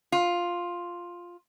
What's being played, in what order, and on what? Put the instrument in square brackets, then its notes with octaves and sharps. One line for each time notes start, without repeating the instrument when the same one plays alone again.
[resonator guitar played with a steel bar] F4